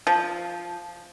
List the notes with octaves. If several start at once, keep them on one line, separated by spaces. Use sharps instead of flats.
F3